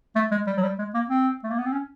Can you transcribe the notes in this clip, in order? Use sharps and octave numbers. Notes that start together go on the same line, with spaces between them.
A3
G#3
G3
F#3
G3
G#3
A#3
C4
A3
A#3
B3
C4
C#4